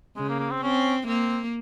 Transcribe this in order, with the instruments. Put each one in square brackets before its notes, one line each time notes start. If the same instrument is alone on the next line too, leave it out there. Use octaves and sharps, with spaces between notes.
[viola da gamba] C#3 [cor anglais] G#3
[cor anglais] A#3
A#3
C4
[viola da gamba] C4 [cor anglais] C#4
[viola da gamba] A#3 [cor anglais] C4